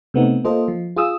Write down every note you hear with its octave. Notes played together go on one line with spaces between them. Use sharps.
C3 A3 B3 C4 D#4
A#3 F4 A4 C5 D#5
F3
F4 G#4 D#6 E6